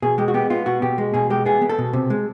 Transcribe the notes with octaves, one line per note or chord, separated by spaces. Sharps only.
B2 G#4
G#3 G4
F#4
B3 G4
B3 F4
B2 F#4
B2 G4
G#3
B2 G#4
G#3 G4
B3 G#4
B3
A4
B2
C3
G#3